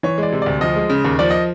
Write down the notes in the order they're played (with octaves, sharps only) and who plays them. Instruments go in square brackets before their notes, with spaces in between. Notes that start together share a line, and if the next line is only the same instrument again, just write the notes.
[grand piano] E3 C#5
G#3 D5
C3
D2 D5
F3 D#5
G#3
C#3
D#2
F3 D5
D#5